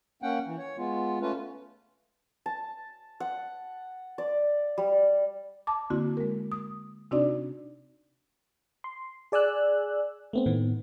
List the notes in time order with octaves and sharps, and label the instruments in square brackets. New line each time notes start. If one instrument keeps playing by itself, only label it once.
[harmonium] A#3 C#4 F#5 G5
E3
C#5
G#3 B3 F4
A3 C#4 F4 B4
[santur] A5
F#5
D5
G3
[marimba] A5 D6
D3 A#3 C4 E4 F#4
G#3 A#4
D#6
C3 C4 D4 D#4 F#4 D5
[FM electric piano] C6
G#4 D5 G#5 E6 F#6
A3 B3 C4
A2 D#3 B3